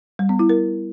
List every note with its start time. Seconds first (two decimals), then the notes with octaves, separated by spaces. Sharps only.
0.19 G3
0.29 B3
0.39 E4
0.49 A#4